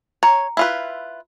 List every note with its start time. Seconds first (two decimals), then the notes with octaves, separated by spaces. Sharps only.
0.23 C#5 A#5
0.57 E4 F4 B4